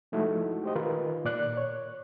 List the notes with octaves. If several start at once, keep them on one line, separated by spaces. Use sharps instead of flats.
F3 G#3 A3 D#4 E4 F#4
G4 C5 D#5
D#3 F4 A#4 B4
A#2 D5 F#6
C#5